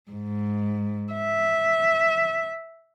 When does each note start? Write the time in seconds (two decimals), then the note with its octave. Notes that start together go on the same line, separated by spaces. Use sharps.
0.11 G#2
1.13 E5